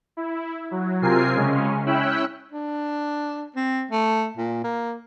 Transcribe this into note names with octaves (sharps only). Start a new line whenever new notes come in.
E4
F#3
C3 C4 F4 A#4 G#5 C7
C#3 G#3 C#4
C#4 E4 G5 B5 E6 F#6
D4
C4
A3
A#2
A#3